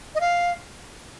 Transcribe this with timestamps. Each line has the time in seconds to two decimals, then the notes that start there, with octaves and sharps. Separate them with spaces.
0.15 D#5
0.20 F5